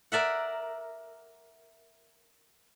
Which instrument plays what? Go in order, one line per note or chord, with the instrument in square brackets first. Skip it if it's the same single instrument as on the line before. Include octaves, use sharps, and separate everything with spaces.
[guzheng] A#4 D5 E5 F#5